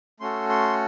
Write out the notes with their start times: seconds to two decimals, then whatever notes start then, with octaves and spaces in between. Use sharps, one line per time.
0.20 A3 C#4 F#4 A4 C6
0.49 C6